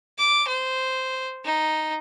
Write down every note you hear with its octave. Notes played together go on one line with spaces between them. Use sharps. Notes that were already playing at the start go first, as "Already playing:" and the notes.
D6
C5
D#4